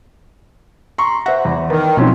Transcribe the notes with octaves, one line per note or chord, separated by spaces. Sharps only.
A#5 C6 C#6
C5 E5 F#5 A#6
E2 E3
D#3 B4 A5 B5
B2 F3 F#3 C4 C#4 D#4